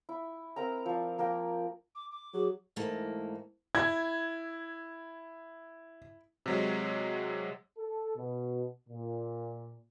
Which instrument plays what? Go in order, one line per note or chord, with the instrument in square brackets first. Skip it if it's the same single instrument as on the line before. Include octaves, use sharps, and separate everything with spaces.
[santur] E4
C4 A#4 G5 A#5
F3 D5
F3 A#3 A#4 G5
[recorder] D6
D6
[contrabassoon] F#3 [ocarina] G#4
[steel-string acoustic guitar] G#2 E3 A3 A#3
[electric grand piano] E4 [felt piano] G#6
[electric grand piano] C3 F#3 G#3
[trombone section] A4
B2
A#2